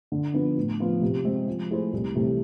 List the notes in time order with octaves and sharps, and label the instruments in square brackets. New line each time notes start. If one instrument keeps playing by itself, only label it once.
[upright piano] D3
F3 B3 D4
A2
F3 B3 F4
C3
G#3 C4
F3
A3 E4 G#4 C5
C2
C3 E3 A3